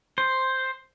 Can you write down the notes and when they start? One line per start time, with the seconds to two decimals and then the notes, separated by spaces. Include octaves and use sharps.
0.18 C5